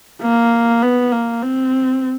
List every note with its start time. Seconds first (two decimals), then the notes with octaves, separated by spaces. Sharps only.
0.22 A#3
0.82 B3
1.12 A#3
1.42 C4